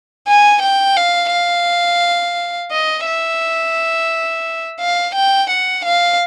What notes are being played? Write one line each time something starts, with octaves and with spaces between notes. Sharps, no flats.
G#5
G5
F5
F5
D#5
E5
F5
G5
F#5
F5